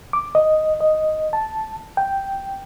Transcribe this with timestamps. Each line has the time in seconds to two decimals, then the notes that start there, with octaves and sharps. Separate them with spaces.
0.13 D6
0.35 D#5
0.81 D#5
1.33 A5
1.97 G5